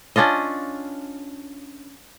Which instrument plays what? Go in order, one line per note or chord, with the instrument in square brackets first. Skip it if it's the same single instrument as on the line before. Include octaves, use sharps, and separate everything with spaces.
[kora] C#4 D4 F4 D#5